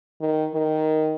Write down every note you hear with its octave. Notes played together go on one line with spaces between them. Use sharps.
D#3
D#3